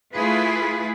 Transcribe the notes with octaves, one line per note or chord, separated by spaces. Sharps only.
A3 E4 F4 G#4 B4